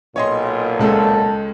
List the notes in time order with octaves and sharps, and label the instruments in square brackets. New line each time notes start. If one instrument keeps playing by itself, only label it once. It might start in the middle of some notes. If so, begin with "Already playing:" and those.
[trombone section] B1 A#2 [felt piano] C#5 D#5 C6
[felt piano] C#2 G#3 A4 [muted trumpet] A5